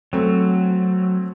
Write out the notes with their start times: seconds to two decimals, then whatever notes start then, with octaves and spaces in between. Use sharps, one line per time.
0.13 F#3 A3 C4